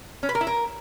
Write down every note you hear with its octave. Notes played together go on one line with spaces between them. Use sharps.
C#4
B4
A#4
E4
A#4